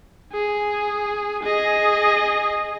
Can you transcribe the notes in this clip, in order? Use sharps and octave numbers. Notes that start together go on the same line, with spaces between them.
G#4
G#4 D#5